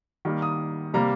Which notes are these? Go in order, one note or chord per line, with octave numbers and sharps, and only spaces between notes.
D#3 G3 A#3
D#6
C3 G3 A#3 A#5